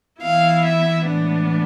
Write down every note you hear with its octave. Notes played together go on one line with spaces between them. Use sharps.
E3 B3 E4 F5
E5
A2 E3 G#3 B3 D4